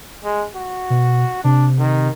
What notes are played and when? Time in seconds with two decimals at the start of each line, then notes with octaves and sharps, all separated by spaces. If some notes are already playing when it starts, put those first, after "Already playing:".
0.24 G#3
0.54 F#4
0.90 B2
1.44 C3 D4
1.78 D#3